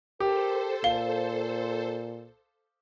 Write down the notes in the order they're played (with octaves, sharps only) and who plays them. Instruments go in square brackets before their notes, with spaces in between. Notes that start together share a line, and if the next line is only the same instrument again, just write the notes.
[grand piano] G4 [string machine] A4 C5 [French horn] A#4
[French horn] A#2 [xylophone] F5 [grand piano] G7